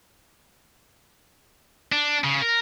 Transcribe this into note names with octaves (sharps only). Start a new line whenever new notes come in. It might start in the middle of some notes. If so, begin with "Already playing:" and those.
D4
C#3
A#4